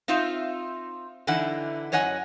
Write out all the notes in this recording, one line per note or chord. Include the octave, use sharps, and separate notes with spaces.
C4 D#4 F4 E5
D3 E3 D#4 E4 F#5
F#2 C#5 D#5 F#5 G#5